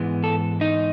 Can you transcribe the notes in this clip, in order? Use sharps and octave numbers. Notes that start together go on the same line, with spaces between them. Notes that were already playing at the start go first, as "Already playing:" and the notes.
Already playing: G#2 E3 G#3 B3
A4
D#4